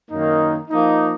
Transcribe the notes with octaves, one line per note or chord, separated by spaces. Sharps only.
F#2 D#3 A#3 D#4
F3 A#3 D#4